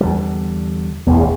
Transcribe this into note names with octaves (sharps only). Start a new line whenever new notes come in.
E2 D3 G3
E1 A1 E2